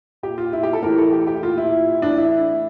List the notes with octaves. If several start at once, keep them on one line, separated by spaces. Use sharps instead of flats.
A#2 G4
F4
E4
G4
A4
A2 E3 A#4
A4
G4
G4
A#2 F4
E4
A2 E3 D4
E4